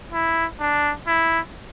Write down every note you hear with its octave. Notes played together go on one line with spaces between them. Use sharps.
E4
D4
E4